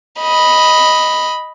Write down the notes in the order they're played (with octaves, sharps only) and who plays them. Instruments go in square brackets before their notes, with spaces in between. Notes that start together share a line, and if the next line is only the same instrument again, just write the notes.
[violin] D#5 B5